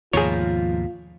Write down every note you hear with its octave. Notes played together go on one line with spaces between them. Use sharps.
D#2 G#2 B2 F3 F4 G#4 A#4 C#5